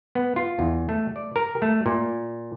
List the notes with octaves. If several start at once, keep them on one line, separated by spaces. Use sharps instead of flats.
B3
F4
E2
A3
D5
A#4
A3
A#2